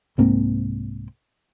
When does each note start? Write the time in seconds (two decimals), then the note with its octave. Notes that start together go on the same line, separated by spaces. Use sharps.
0.18 C2 G#2 A#3 C4